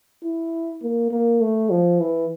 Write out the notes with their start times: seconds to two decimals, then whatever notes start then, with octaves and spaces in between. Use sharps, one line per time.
0.24 E4
0.83 A#3
1.12 A#3
1.41 A3
1.70 F3
2.00 E3